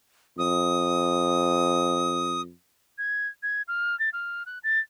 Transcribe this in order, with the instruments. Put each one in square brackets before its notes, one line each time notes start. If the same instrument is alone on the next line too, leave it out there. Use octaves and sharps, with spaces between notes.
[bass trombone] F2 [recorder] D#6
[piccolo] G#6
G#6
F6
A6
F6
F#6
A6